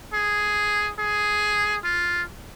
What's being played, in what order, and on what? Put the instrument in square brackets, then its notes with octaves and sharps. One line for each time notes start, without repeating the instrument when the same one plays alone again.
[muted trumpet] G#4
G#4
F4